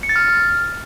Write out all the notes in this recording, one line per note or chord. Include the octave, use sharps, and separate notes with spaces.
C#7
A6
F6